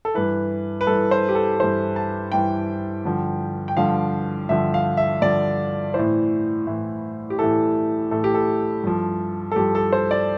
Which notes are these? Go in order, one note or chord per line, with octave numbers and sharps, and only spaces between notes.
A4
G2 E3 B4
B4
G2 E3 A4
C5
G4
A4
G2 E3 C5
A5
G2 E3 G5
G2 D3 F3
G5
G2 D3 F3 F5
G2 D3 F3 E5
F5
E5
G2 D3 F3 D5
A2 E3 C5
A2 E3
G4
A2 E3 A4
A2 E3 A4
G4
A4
G2 F3
A4
G2 F3 G4
A4
C5
D5